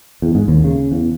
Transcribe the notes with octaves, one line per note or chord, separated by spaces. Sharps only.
E2
G#2
D#2
C#3
E2